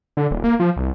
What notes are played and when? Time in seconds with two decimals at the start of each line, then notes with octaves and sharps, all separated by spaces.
0.17 D3
0.31 D#1
0.44 A#3
0.60 F3
0.76 C2